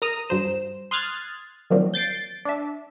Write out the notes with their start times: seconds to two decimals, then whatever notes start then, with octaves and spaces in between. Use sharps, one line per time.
0.02 A#4 A#5 D#6
0.29 G2 F#3 C5 E7
0.91 C6 D#6 F6 F#6 G#6 A6
1.70 D#3 F3 F#3 A#3 C4 D4
1.94 G6 A6 C7 D7
2.45 D4 E5